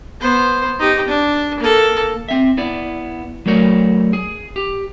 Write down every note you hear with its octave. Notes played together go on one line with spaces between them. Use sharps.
B3 C5
D#4 G4
D4
A#3 A4
C4 E5
B3 E4 D5
F#3 A3 A#4 C#5 D5
G#4
G4